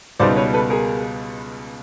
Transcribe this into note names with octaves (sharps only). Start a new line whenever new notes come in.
C#2 B2 G3 B3 D#4 C5 D5
B4 C#5
A4 B4
G#4 A#4